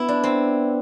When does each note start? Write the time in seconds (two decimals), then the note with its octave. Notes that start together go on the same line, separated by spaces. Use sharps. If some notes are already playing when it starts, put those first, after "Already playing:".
Already playing: B3 E4
0.09 D4
0.24 C4